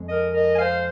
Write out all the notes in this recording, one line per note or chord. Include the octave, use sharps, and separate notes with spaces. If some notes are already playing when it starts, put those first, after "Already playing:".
Already playing: F2 F3 G#3
A#4 D#5
A#4 D#5
G#5
C5 F5